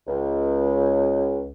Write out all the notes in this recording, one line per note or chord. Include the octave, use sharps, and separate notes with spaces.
C#2